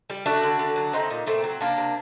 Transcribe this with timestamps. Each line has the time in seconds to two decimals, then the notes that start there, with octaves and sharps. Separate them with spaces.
0.10 G3
0.26 A3 D4 F#4
0.43 D3
0.59 D3
0.76 F#3
0.93 A3 C4 D#4
1.10 A#2
1.26 A#2 A3 C4
1.44 F#3
1.61 C3 A#3 D4
1.77 C3